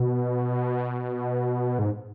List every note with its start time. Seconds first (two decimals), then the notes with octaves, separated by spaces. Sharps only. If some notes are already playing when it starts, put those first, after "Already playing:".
Already playing: B2
1.79 G#2